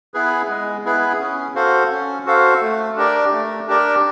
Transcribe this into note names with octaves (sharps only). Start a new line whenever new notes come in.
B3 E4 G#4 B4
G#3
B3 E4 G#4 B4
C#4
F#4 A4 C5 F5
C#4
F#4 A4 C5 F5
A3
D4 G4 A#4 D5
A3
D4 G4 A#4 D5